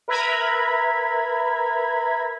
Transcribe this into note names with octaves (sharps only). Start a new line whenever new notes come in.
A#4 B4 E5 A#5 B5 G#6